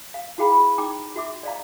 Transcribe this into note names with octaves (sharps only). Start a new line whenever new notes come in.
F5
E4 F#4 G#4 F5 G5 B5
B5
D#4 G5 A#5 D6
F#4 E5 D6
D5 D#5 F5 A#5